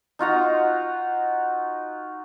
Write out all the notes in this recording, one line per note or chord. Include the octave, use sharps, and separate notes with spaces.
D#4 F4 F#4 A#5